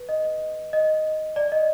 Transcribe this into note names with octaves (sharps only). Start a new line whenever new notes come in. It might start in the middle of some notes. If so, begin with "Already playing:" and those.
Already playing: B4
D#5
D#5
D5
D#5